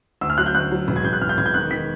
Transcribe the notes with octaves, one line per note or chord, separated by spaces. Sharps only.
D2 E6
F6
F#3 F#6
G6
D2 F#6
F#3
E1
G#6
E1 G6
F#6
E1 F6
G6
E1 G#6
G6
D#3 F#6
D#3 B6